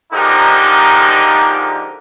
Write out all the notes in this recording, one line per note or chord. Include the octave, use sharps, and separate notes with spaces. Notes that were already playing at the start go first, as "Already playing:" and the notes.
G#2 D3 F3 D#4 G4 A#4